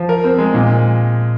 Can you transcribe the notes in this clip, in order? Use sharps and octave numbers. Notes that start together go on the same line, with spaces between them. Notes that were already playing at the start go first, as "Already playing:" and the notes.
Already playing: F3
A#4
C4
G#3
A#2